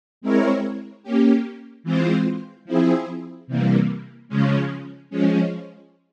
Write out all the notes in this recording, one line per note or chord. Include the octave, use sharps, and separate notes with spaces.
G#3 C4 E4 A#4 C#5
A#3 C#4 G4
E3 G#3 C4 F4 C5
F3 C4 E4 G#4
C3 E3 G3 A#3
C#3 F3 G#3 C#4
F3 G#3 C#4